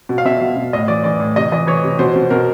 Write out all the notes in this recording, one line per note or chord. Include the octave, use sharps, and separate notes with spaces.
B2
F5
B2 E5
B2
B2
A2 D#5
E3 D5
E3 D5
A2
C3 D#5
E3 D#5
E3 C#5
C3
B2 C5
B2
B2 A#4